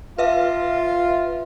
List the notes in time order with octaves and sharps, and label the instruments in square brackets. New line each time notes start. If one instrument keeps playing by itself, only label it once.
[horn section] F4 [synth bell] B4 E5 F5